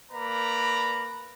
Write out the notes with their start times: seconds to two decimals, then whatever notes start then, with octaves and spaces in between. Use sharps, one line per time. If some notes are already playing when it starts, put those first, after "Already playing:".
0.12 A#3 B4 D5 A#5 B5